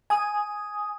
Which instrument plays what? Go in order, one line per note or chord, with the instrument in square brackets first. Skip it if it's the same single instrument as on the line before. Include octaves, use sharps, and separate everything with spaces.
[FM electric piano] G#5 D#6